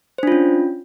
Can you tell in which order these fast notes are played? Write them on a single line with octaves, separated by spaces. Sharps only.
C5 D4 F4 C#4